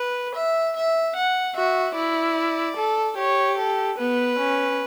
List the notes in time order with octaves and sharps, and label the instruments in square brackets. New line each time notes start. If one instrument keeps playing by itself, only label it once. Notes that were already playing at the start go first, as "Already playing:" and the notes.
Already playing: [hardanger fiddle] B4
E5
E5
F#5
[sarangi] F#4 [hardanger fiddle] E5
[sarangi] E4 [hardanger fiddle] D5
[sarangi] A4
[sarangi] G4 [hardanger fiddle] C#5
[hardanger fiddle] A4
[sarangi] B3 [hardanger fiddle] B4
[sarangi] C#4